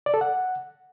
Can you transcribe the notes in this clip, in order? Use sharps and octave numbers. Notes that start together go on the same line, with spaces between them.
D5
A4
F#5